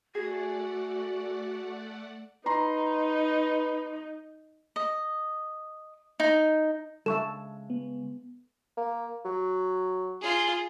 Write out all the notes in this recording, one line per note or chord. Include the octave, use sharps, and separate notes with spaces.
A3 F#4 G#4 D5 F#5
D#4 B4 A#5 C6
D#5
D#4
C#3 G#3 A4 E5 C#6 E7
B3
A#3
F#3
F4 G#4